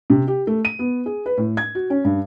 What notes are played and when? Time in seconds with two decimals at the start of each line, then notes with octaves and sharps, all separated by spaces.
0.10 C3
0.28 G4
0.47 A3
0.65 D#7
0.79 B3
1.06 G#4
1.26 B4
1.37 A2
1.57 G#6
1.75 F#4
1.90 C#4
2.05 G2